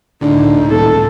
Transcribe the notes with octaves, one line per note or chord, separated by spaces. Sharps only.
C#2 A2 D3 D#4
D#1 A4